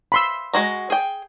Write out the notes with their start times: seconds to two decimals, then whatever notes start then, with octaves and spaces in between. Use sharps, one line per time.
0.12 B5 C6 E6
0.53 G#3 F#4 A#5
0.90 G#4 G5